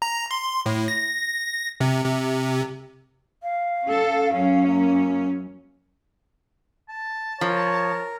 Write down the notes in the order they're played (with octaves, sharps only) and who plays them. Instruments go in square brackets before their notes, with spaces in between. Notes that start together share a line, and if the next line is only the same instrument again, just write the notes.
[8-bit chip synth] A#5
C6
A2
A#6
C3
C3
[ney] F5
[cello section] C#4 A4
F#2 C#4
[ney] A#3
[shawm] A5
[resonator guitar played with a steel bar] F3 [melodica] A#4 [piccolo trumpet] C#5